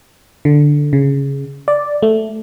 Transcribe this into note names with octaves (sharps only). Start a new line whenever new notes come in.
D3
C#3
D5
A3